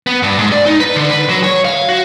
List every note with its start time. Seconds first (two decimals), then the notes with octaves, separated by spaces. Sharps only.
0.07 B3
0.23 G2
0.39 G#2
0.52 D5
0.66 D#4
0.80 B4
0.96 D3
1.11 B4
1.29 F#3
1.44 C#5
1.65 F5
1.89 F#4